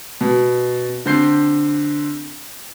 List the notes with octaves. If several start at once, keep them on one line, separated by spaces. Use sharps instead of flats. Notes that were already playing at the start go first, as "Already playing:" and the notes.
B2
D3 C4 G6 C7